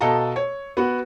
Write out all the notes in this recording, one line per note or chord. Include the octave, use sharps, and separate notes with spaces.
B2 A4 D#5 F5 A5 A#5
C#5
B3 F#4